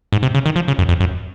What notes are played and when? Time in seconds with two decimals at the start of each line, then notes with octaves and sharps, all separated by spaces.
0.12 G#2
0.23 C3
0.35 C#3
0.46 D#3
0.56 F3
0.68 C#3
0.79 F#2
0.89 F2
1.00 F#2